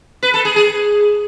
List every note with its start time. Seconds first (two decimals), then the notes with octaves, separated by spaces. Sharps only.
0.23 B4
0.34 A4
0.45 G#4
0.56 G#4